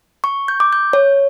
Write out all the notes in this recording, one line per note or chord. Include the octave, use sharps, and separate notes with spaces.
C#6
G6
D6
G6
C#5